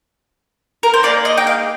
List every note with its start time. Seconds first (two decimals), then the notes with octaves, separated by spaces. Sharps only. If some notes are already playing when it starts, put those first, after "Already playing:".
0.83 A#4
0.94 C5
1.03 A#3 D#4 G#4 D5
1.25 D#5
1.37 G5
1.47 F5